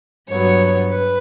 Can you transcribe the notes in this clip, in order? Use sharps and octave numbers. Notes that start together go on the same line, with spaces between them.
G2 F#3 B3 C#5
B4